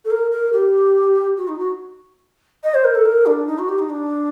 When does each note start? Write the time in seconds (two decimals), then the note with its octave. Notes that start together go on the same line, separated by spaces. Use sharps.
0.05 A4
0.11 A#4
0.31 A#4
0.53 G4
1.37 F#4
1.48 D#4
1.59 F#4
2.64 D#5
2.74 C5
2.84 A#4
2.95 A4
3.05 A#4
3.26 D4
3.47 D#4
3.59 F#4
3.69 G4
3.79 D#4
3.89 D4